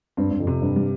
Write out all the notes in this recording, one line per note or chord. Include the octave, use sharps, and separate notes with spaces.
G2 C4
G2
F2
C3
G2
G3